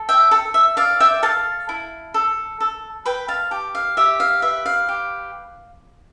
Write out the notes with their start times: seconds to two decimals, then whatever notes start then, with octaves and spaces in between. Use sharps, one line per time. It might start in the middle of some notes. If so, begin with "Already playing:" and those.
Already playing: A4
0.09 E5 G5
0.31 A4
0.54 E5
0.77 D5 F5
1.00 E5 G5
1.23 A4 F5 A5
1.69 E4
2.14 A4
2.60 A4
3.05 B4 G5 B5
3.28 F5 A5
3.51 G4
3.75 F5
3.97 G4 E5
4.20 F5
4.42 B4 E5
4.66 F5
4.89 G4